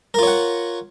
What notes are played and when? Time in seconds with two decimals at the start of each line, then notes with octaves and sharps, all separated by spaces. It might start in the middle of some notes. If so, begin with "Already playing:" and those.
0.14 A#4
0.19 F4
0.23 C#5
0.27 F#5